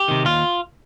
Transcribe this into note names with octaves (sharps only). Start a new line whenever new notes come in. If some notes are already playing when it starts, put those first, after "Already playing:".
Already playing: G4
C3 D#3
D#2 F4